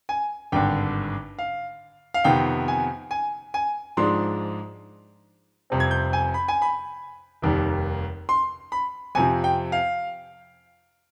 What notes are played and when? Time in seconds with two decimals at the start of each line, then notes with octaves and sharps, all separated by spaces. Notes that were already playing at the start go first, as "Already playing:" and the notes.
0.09 G#5
0.52 G#1 G2 D3 G5
1.39 F5
2.14 F5
2.24 F2 C3 D#3 B3 G5
2.68 G#5
3.11 G#5
3.54 G#5
3.97 G#2 F3 G#3 D4 C6
5.70 F1 F2 C3 G3 C4
5.80 G#6
5.91 G6
6.13 G#5
6.34 B5
6.48 G#5
6.62 B5
7.42 F1 D#2 D#3 G3
8.29 C6
8.72 B5
9.15 F2 C3 F3 G#5
9.44 G5
9.72 F5